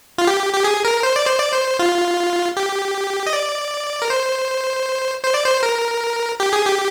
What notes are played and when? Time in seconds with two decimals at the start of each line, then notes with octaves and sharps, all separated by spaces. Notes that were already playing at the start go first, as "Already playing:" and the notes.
0.18 F4
0.27 G4
0.54 G4
0.64 G#4
0.85 A#4
1.03 C5
1.16 D5
1.27 C5
1.40 D5
1.52 C5
1.79 F4
2.57 G4
3.27 D#5
3.33 D5
4.02 A#4
4.10 C5
5.24 C5
5.34 D5
5.45 C5
5.63 A#4
6.40 G4
6.53 G#4
6.66 G4